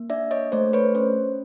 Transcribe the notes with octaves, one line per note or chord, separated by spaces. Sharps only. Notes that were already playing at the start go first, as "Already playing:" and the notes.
Already playing: A#3
D4 D5 E5
C#5 D#5
A3 C5 D5
B4 C#5
C#4 C5